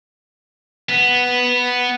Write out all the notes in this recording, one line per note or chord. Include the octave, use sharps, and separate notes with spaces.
B3